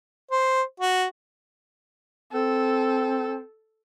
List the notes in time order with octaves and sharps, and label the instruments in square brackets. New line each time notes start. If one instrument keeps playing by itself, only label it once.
[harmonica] C5
F#4
[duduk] C4 [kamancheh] A4